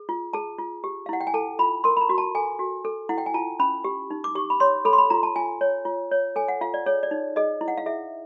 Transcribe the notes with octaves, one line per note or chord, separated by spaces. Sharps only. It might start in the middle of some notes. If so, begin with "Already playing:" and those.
Already playing: G#4
F4
G#4 A5
F4
G4
F5
E4 F#5
G5
G#5
A4 A5
F4 B5
A#4 C6
B5
A#5
F#4
A5
A4 G#5
F#4
A4
E4 F#5
G5
G#5
F4 A5
C#4 B5
G4
D#4
D6
G4 C#6
B5
C#5 C6
A4 B5
C6
B5
F4 A#5
A5
F4 G#5
C#5
F4
C#5
A4 G#5
F#5
F4 F5
D5
G#4 C#5
D5
D#4
G#4 D#5
E4
F#5
F5
G#4 E5